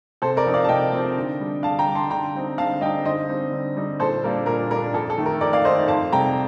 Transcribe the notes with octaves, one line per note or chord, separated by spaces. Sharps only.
C3 A4 C5
A#4 D5
F3 C4 D#4
D5 F5
A5
C3 D#5 G5
F3 C4 D#4
D3
G3 D4
D3 F5 A5
G5 A#5
G3 D4
A5 C6
D3 G5 A#5
G3 C4 D#4
D3 F5 A5
G3 C4 D#4 D#5 G5
D3 C5 D#5
G3 C4 D#4
D3
G3 C4 D#4
A#2 A4 C5
G3 A#3 D4 A#4
A#2 A#4
G3 A#3 D4 A#4
F2 A4
A4
D#3 A3
A#4
F2 A#4 D5
D5 F5
D#3 A3 C5 D#5
F2 F5 A5
C3 G3 G5 A#5